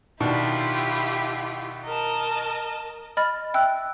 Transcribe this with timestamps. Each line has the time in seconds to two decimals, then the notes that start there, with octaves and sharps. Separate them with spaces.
0.20 B2 D#3 D4 E4 F4 G4
1.84 A#4 D#5 A5
3.17 D#5 B5 F6 A6
3.54 E5 G5 E6 F#6